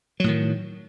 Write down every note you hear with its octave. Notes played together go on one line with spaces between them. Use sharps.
A2 D#3 F#3